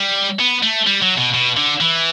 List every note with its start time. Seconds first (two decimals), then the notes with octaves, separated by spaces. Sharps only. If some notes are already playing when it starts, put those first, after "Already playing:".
Already playing: G3
0.39 B3
0.63 A3
0.86 G3
1.02 F#3
1.18 B2
1.34 B2
1.57 D3
1.81 E3